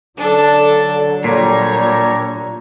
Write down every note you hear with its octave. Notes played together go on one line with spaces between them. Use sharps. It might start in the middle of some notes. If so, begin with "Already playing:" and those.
D3 F#3 D4 A4
A#2 G3 D4 C#5 A#5